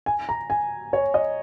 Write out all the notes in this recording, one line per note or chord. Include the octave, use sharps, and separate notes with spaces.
G#5
A#5
G#5
C#5
D#5